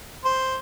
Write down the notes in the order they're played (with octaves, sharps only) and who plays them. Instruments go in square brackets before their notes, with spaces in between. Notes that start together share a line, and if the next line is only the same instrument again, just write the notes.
[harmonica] C5